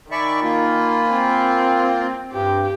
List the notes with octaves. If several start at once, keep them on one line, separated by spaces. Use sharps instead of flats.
D#3 D5 E5 G#5 B5 C#6
A#3 F4
C4
G2 G4